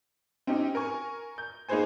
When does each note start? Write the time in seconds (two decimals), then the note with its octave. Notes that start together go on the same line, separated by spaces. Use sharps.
0.47 C4 C#4 D#4 G4
0.75 A#4 G#5 C#6
1.38 G6
1.69 A#3 D#4 G#4 B4 C5 G#5